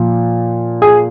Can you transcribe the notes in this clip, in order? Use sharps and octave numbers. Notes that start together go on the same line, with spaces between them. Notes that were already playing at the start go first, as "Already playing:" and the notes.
Already playing: A#2 F3
G#4